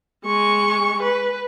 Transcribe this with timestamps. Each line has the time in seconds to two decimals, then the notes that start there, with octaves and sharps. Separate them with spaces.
0.25 G#3 C#6
1.03 B4